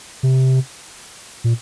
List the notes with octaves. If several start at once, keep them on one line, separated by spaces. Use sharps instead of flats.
C3
A#2